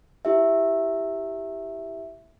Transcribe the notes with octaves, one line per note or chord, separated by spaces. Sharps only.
E4 G4 E5